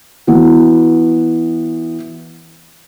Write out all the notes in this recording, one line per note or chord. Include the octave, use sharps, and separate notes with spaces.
E3 B3 F#4